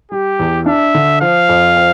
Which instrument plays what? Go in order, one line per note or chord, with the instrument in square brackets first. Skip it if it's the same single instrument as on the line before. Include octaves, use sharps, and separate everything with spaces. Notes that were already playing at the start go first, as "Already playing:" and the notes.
[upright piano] G3 [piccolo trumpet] G4
[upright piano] E2
[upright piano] D4 [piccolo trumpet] E5
[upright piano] D3
[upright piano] F3 [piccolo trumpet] F5
[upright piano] F2
C4